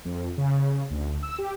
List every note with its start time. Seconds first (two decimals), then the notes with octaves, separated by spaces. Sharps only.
0.05 F2
0.38 C#3
0.90 D2
1.23 E6
1.38 G4